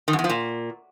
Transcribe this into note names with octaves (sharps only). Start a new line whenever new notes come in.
D#3
F#2
E2
F3
A#2